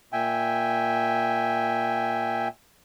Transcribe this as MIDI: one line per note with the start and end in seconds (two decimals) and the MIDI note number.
0.13 2.48 46
0.13 2.48 76
0.13 2.48 79
0.13 2.48 80